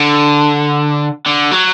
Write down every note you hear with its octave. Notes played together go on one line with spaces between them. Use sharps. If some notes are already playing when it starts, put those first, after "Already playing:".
Already playing: D3
D3
F#3